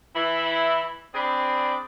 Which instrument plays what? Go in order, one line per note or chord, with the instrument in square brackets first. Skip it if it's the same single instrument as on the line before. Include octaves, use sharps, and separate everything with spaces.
[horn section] E3 E4
C4 D4 G#4 D5 B5